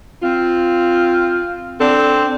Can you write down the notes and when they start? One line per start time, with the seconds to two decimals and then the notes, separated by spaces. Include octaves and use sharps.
0.22 C4 F4
1.79 C4 D4 A4